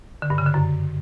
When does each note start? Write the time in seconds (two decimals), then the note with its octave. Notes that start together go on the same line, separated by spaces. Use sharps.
0.22 D3
0.30 G2
0.38 C#3
0.46 D3
0.54 F#2